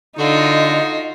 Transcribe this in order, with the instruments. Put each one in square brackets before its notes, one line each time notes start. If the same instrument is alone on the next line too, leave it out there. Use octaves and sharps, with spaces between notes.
[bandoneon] D3 [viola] D#4 [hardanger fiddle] F4 F#4 [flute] D#5